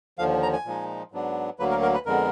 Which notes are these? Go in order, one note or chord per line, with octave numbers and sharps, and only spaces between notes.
D#2 D3 F3 F5
A#5
G#5
A#2 F3 G#3 D#4
G#2 F#3 B3 D4
D2 D3 F#3 A#3 B4
A#4
A#4
B4
F2 D3 G#3 B3 A#4